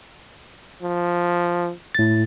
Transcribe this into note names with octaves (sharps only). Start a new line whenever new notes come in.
F3
A2 A6